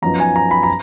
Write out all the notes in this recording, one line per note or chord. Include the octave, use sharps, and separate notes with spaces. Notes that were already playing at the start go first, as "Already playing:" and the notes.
F#2 F3 B3 D#4 A#5
G#5
A#5
B5
A#5